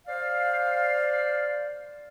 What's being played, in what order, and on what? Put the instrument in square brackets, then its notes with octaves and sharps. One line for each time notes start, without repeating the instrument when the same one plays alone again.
[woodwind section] C5 D5 F5